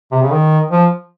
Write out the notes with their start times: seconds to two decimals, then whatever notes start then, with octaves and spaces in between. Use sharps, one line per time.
0.12 C3
0.22 C#3
0.31 D#3
0.71 F3